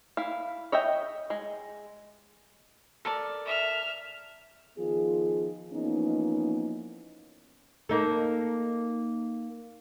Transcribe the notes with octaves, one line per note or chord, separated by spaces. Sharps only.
E4 F5
C#5 D#5 E5 G5
G#3
A4 A#4 D5
E5 F6
D#3 F3 B3 F4 G#4
E3 F3 A#3 B3 C#4 D#4
A#3 D#4 A4